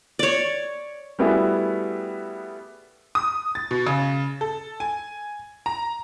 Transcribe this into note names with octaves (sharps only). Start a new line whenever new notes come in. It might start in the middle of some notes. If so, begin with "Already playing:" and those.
C#5 D5
G3 A3 B3 E4 F#4 G#4
D#6
A6
B2
C#3
A4
G#5
A#5